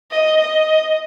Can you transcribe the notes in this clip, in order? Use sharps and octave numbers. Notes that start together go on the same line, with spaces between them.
D#5
D#5